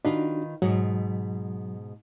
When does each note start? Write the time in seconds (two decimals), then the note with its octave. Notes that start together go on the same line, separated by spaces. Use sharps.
0.05 D#3 D4 D#4 F4 F#4 B4
0.62 G#2 B2 F#3